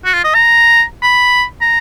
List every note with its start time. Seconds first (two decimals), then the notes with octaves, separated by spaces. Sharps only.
0.05 F#4
0.14 F4
0.24 D#5
0.34 A#5
1.03 B5
1.61 A#5